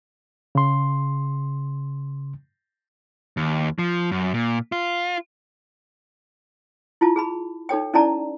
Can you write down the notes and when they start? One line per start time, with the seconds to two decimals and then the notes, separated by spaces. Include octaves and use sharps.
0.55 C#3 C6
3.37 D#2
3.79 F3
4.12 F#2
4.34 A#2
4.72 F4
7.01 E4 F4 A5
7.16 G#4 A5 B5
7.69 D#4 A4 C#5 G5
7.94 C#4 D#4 E4 D5 A5 A#5